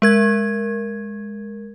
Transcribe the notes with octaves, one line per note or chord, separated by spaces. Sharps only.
G#3 A#4 G#6